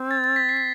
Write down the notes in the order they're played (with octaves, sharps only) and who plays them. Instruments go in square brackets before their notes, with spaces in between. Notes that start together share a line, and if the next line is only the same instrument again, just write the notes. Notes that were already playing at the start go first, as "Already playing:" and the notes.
Already playing: [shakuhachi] C4
[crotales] A6
A6
B6
C7
B6